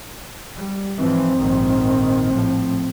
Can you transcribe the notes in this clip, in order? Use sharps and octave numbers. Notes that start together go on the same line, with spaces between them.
G3
G#2 E3 F3 C4
A#1 G#2 D#3
A2 F3